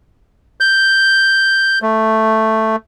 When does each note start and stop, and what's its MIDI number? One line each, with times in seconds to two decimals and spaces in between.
0.60 1.79 91
1.82 2.76 57